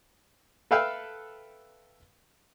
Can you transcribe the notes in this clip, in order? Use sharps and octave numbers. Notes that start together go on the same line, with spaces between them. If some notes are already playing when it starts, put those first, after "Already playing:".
A4 B4 E5 F5 G5